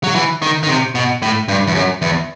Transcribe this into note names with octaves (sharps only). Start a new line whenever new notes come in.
F#3
E3
D#3
D#3
C3
B2
A2
G2
E2
F#2
E2